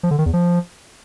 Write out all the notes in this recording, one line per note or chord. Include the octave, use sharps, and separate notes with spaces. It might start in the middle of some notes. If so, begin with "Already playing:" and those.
F3
D3
D#3
E2
F3